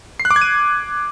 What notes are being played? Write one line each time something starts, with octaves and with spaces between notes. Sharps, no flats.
C7
F#6
D6
G#6
D#7